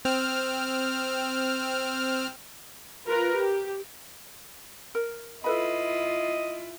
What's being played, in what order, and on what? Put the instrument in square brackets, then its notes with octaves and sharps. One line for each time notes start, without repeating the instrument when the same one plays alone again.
[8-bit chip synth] C4 F6
[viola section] F4 A#4 B4
G4
[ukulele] A#4
[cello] E4 F4 [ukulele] A4 B4 B5 [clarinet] D#5